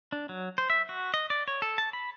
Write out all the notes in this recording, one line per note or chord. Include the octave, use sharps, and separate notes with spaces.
D4
F#3
C5
E5
F#4
D#5
D5
C#5
A4
A5
B5